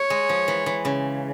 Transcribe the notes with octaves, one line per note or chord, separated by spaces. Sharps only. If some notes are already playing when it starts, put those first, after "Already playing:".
Already playing: C#5
G#3
F3
E3
E3
C#3